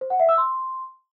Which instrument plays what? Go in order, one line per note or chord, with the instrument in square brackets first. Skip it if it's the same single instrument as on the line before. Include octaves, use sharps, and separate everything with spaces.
[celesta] C5
F#5
E5
E6
C6